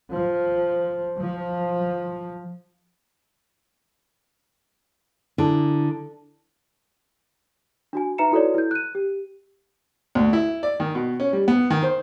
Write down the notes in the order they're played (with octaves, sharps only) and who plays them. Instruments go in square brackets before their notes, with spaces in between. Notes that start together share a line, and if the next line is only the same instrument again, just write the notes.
[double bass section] F3
F3
[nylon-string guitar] D3 [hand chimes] D4 E4 A4
[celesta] D4 F#4 G#5
D#4 B4 E5 A#5 C#7 E7
E4 F#4 A4 B4 C#5 D5
E4 G6
F#6 D#7
G4
[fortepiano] D2
E4
D5
D#3
B2
C#4
G3
B3
D#3
C5